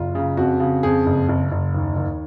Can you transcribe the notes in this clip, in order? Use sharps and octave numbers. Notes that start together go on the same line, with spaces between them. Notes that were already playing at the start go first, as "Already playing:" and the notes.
Already playing: F#1 F4
C#3
F2 F#4
C#3
F2 G#4
F#1
F#1
F#1
D#2
D#2